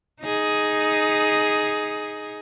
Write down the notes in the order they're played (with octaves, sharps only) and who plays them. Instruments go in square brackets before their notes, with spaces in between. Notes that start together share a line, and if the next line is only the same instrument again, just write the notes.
[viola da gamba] D#4 G#4